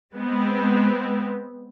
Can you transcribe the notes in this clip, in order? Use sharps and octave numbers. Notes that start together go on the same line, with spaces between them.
G#3 B3 C4